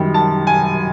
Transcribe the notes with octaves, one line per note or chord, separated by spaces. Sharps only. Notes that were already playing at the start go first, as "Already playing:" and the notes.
Already playing: F#2 D#3 G3
A5
G#5